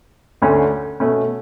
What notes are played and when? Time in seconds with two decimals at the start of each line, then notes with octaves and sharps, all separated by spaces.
0.42 D2 D3 A3 C#4
1.00 B2 A3 C#4